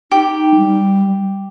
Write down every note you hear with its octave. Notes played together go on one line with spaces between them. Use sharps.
D#4 G4
G3